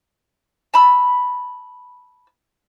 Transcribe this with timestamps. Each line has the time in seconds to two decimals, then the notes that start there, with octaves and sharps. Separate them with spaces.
0.74 A5 B5 E6